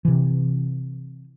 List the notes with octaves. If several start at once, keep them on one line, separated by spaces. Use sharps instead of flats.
C3 E3